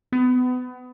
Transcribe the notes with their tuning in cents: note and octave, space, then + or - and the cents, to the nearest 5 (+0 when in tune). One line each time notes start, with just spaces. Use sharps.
B3 +30